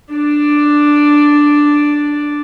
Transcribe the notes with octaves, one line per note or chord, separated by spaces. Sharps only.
D4 D5